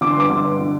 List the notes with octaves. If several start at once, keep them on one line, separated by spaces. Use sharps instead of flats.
D3 D6
C6
G2 D6
D3
G2
D3